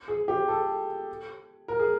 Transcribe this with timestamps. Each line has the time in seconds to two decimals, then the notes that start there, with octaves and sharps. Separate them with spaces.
0.08 G#4
0.28 G4
0.48 A4
1.68 A#4
1.79 G#4